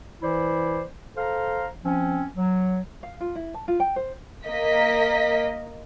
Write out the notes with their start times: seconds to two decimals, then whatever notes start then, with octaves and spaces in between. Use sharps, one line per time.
0.22 E3 E4 C5 D5
1.16 A4 C5 F5 A#5
1.84 F3 C4 C#4
2.35 F#3
3.03 F5
3.20 F4
3.35 E4
3.54 A5
3.68 F4
3.80 G5
3.96 C5
4.45 A#3 D#5 B6